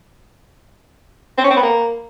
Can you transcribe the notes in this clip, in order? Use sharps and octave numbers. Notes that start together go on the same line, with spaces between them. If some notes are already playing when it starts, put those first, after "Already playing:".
C4
C#4
C4
B3
A#3